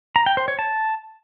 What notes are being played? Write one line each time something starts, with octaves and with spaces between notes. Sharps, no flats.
A#5
G5
C5
C#5
A5